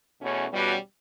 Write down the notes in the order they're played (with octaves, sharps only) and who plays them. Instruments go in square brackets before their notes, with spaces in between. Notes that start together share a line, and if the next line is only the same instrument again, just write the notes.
[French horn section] E2 B2 A3 C#4
E2 B2 G3 C#4 F#4